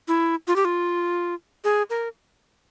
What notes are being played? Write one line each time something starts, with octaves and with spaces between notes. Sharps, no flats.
E4
F4
G4
F4
G#4
A#4